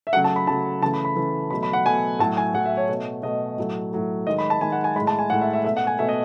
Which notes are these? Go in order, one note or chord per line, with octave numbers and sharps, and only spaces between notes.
E5
C#3 F#3 A3 F#5
A5
B5
C#3 F#3 A3 A5
C#3 E3 A3 A5
B5
B5
C#3 E3 A3
B2 F#3 A3 B5
B5
F#5
B2 F#3 A3 G#5
A2 F#3 A3 A5
G#5
A2 F#3 A3 F#5
E5
C#5
B2 A3
B2 A3 D#5
A2 F#3 A3
A2 F#3 A3
D#3 G#3 D#5
B5
A5
D#3 G#3 G#5
F#5
G#5
A2 G#3 B5
A5
G#5
A2 G#3 F#5
E5
E5
B2 A3 E5
F#5
G#5
B2 A3 E5
D#5